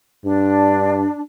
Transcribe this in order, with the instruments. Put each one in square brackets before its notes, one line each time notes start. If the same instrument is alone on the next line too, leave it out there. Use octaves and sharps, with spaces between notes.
[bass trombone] G2 [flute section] D4